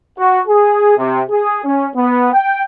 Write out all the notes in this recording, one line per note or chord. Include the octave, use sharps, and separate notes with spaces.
F#4
G#4
C3
G#4
C#4
B3
G5